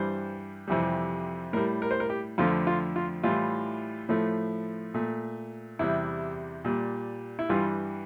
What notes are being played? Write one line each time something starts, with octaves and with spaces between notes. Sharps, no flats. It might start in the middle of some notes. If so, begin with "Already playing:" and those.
Already playing: G2 E3 G3 C5
F2 C3 E3 G3
A2 G3 A#4
A#4
C5
A#4
G4
F2 D3 F3 A3 F4
F4
F4
A2 E3 G3 F4
A2 F3 A3
A#2 A3
E2 C3 G3 E4
A#2 G3
E4
G2 E3 G3 F4